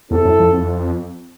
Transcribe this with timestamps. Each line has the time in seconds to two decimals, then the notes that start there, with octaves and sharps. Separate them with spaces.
0.11 E2 C4 E4 A4
0.25 F#2
0.40 F2
0.53 F2